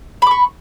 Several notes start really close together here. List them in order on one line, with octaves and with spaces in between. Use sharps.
B5 D6 C#6